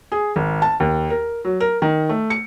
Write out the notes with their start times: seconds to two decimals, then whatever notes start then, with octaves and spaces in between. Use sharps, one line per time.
0.12 G#4
0.36 G#1
0.62 A5
0.80 D#2
1.10 A#4
1.45 F#3
1.60 A#4
1.82 D#3
2.09 A3
2.30 C#7